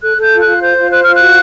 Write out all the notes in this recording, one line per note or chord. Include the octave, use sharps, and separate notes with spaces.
A4 F#6
A4 G6
F4
F#6
F4
C5 G6
F4
C5 F#6
F4 F6
F#6
F#4